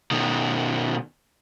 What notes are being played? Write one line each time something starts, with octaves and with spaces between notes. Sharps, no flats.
B2 D#3